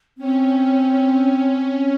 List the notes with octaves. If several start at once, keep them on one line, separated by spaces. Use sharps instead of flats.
C4 C#4